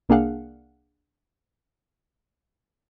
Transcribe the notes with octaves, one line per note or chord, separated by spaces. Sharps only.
C2 A#3 D4 G#4 F5 F#5